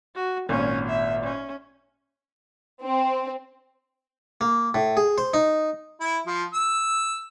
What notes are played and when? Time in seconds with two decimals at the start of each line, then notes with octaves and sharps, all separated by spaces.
0.15 F#4
0.49 G#1 A#2 C#4
0.89 E5
1.23 C#4
2.82 C4
4.41 A#3
4.74 A2
4.97 G#4
5.18 C5
5.34 D#4
6.01 E4
6.26 F3
6.54 E6